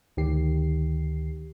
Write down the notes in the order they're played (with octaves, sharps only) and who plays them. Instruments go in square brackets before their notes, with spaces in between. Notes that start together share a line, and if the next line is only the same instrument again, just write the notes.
[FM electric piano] D2 D#3 G4 C7